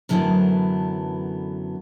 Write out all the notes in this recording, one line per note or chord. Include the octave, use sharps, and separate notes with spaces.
F#2 D3 E3 F#3 A3 B3